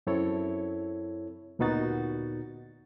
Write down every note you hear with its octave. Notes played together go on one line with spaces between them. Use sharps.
F#2 C4 E4 A4 C#5
D2 A#2 B3 D#4 F#4 A6